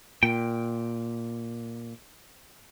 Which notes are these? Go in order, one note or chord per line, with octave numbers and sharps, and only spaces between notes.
A#2 G5